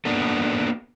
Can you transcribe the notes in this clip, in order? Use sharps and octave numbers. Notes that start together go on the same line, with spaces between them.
A#3 B3 D4 F#4 A4